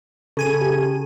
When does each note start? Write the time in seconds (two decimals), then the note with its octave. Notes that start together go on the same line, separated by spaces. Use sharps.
0.37 C#3 A4 G#5 D#7
0.61 G4